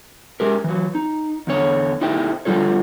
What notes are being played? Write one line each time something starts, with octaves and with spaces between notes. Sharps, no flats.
G#3 G4 A#4
E3 F#3
D#4
E2 D3 C#5
A3 D#4 E4 G4 C5 G5
D3 F3 G3 F4 A4 C#5